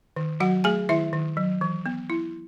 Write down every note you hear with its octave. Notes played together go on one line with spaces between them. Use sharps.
D#3
F#3 F#4 F#5
A3 G#4 G#5
D#3 E4 E5
D#3
F#3
E3
B3
E4